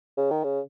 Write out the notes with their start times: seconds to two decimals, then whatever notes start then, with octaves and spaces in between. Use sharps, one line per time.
0.17 C#3
0.30 D#3
0.44 C#3